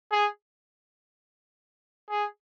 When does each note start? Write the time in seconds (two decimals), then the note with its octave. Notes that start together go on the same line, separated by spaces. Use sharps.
0.12 G#4
2.10 G#4